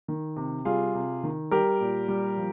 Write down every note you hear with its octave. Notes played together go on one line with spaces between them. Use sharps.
D#3
C3
G3 F4 G#4
C3
D#3
G3 G4 A#4
A#2
G3
F3